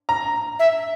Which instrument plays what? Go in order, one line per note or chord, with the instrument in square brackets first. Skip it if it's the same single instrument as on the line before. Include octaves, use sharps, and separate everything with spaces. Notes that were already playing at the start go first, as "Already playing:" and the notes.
[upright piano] A#5
[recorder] E5